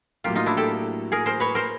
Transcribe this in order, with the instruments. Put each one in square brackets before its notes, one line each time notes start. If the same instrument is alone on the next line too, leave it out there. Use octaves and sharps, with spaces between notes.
[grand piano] A2 F#3 A#3 [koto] F4 G4
[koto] D#4 F4
D4 E4
G4 A4
G#4 A#4
A#4 C5
B4 C#5
A#4 C5